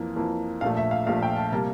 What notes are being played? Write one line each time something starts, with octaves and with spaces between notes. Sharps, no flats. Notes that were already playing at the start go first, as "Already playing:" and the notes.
Already playing: F2 E3 A#3
F2 E3 A#3
A#1 A#2 A3 F5
E5
F5
A#1 A#2 A3 F5
G5
A5
C3 G3 A#3 A5